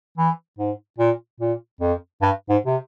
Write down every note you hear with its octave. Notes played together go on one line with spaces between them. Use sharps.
E3
G#2
A#2
A#2
F2
G2
G#2
C3